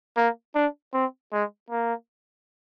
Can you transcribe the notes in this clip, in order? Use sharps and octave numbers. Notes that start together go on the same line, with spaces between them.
A#3
D4
C4
G#3
A#3